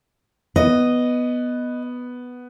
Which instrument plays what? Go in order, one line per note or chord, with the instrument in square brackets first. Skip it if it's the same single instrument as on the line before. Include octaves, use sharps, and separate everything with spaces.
[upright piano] B3 [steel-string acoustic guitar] D#5